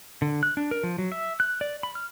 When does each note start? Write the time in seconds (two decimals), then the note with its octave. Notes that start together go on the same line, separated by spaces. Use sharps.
0.22 D3
0.43 F#6
0.57 D4
0.71 A#4
0.83 F3
0.98 F#3
1.12 E5
1.40 F#6
1.61 D5
1.83 B5
1.95 F6